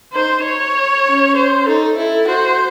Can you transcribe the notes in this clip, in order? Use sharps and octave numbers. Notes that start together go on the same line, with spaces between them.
D#4 C5
C#5
C#4
C5
D#4 A4
E4 A4
F#4 C5